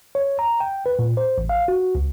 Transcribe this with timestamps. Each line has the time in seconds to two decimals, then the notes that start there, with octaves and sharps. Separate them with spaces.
0.15 C#5
0.39 A#5
0.60 G5
0.86 B4
0.99 A#2
1.17 C5
1.38 A1
1.49 F5
1.68 F#4
1.95 C#2